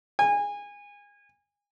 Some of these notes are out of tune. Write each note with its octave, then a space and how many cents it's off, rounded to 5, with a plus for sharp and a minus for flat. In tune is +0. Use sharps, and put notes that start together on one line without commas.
G#5 -25